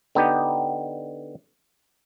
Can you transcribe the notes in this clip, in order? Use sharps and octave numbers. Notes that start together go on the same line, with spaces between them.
D3 B3 D#4 G4